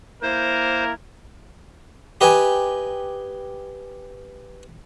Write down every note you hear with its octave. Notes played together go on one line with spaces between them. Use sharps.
A#3 E4 A#4 C5
G4 B4 D#5 G5 G#5